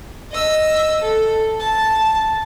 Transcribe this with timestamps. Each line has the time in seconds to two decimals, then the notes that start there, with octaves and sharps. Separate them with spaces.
0.31 D#5 E6
1.01 A4
1.59 A5